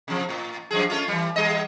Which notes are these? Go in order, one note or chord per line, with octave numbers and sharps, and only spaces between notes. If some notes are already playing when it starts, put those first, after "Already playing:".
C3 F3
A2
F#2 F3 G#4
A3 C#4 F4
E3 G3
E2 G3 D#5